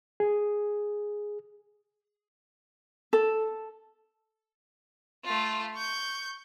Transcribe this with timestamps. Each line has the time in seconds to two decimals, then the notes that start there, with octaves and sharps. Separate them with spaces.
0.20 G#4
3.13 A4
5.24 A3 F4
5.75 C#6 G6